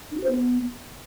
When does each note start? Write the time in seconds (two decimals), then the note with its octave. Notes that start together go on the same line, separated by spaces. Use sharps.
0.11 D4
0.17 F#4
0.23 C5
0.29 B3